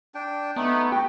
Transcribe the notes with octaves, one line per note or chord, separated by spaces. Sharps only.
D4 G5
A3 B3 D#4
F#4 G4